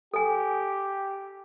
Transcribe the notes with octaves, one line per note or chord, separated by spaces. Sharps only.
G4 A4 G#5